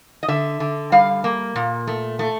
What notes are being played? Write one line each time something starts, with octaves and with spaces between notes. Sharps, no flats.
D#5
D3 E5
D3
G3 F5
A#3
A#2
A3
A3